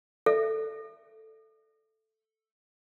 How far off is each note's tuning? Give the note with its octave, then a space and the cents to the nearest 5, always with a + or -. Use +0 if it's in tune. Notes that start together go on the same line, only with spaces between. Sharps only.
A4 +0 E5 +30